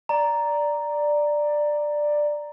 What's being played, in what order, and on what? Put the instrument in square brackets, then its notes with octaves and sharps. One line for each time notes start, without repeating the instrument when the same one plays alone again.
[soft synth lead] D5 [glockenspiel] A#5